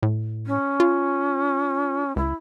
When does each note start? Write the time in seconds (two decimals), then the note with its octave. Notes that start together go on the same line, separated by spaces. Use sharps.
0.03 A2
0.47 C#4
0.80 F4
2.16 C#2 E4